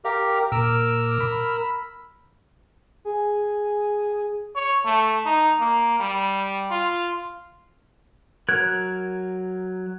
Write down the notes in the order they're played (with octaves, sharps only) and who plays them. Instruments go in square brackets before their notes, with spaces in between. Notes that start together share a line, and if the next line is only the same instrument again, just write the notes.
[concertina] G4 A#4 [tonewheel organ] F5
[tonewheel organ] A#2 D6 [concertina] A#4 E6 F6
[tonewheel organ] B5
[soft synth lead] G#4
[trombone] C#5
A3
D#4
A#3
G3
F4
[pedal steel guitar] F#3 A#4 F#6 [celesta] G#6